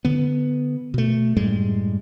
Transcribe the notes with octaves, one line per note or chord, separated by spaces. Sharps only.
D3 B3
B2 A3
F#2 A2 G3 G#3